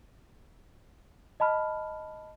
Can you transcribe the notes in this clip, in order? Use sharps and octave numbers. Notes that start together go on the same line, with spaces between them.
D#5 A5 B5 F6